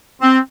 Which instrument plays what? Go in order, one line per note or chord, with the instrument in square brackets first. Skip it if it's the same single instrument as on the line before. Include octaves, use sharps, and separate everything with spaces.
[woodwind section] C4